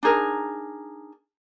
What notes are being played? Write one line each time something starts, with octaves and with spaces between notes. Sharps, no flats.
D4 D#4 G#4 A#4